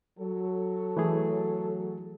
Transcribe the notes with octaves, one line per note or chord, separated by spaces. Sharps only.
F#3 A4
E3 A3 G#4